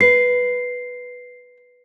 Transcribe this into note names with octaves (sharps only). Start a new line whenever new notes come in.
B4 C7